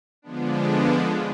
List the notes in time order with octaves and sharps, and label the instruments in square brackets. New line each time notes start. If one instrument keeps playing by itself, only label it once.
[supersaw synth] D3 F3 G#3 B3 D4